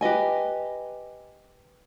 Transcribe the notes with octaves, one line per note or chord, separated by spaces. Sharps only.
G4 B4 D#5 G#5